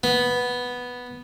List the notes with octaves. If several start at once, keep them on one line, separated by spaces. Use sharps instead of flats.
B3